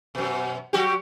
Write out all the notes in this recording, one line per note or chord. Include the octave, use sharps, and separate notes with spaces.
F#2 B2
F#3 F#4 G4